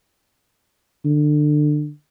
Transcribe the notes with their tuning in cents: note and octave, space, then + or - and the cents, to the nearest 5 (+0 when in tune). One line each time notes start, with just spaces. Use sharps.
D3 +25